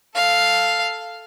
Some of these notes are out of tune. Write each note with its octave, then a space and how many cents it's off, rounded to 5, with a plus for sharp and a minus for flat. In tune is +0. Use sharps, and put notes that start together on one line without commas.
A4 +0 F5 +0